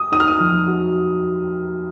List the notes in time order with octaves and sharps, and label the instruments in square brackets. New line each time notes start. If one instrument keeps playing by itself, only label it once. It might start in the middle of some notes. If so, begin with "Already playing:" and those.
Already playing: [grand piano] D#6
[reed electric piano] D#4 [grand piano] D#6
[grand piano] F6
D#6
[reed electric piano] F3
F#4